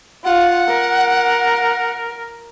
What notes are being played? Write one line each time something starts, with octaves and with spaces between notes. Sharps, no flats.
F4 F#5
A#4